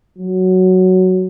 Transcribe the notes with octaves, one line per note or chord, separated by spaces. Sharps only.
F#3